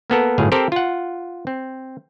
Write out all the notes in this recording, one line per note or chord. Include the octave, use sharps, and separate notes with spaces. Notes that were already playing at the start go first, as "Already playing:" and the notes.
A#3 B3 A4 A#4
G1 A2 F#3 G#4 F5
C4 G4 A4 A#4 C5
F4 F#5
C4